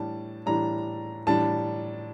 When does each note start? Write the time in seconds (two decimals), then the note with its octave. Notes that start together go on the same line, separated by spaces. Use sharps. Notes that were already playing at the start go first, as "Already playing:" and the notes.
Already playing: A2 E3 G3 D4 A5
0.46 A2 E3 G3 D4 A#5
1.27 A2 E3 G3 D4 A5